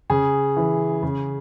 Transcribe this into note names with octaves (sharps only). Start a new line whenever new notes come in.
C#3 G#4
E3
C#3